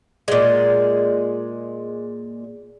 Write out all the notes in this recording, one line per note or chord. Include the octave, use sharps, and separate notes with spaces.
A#2 G#3